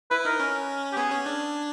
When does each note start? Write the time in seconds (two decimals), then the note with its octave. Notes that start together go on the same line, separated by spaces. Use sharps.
0.11 E4 B4
0.25 D#4 A#4
0.40 C#4
0.92 G4
0.97 B3 G#4
1.11 C#4
1.26 D4